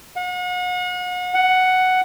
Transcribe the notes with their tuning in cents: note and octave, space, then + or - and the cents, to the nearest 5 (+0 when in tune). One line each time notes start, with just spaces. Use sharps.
F#5 -40
F#5 +5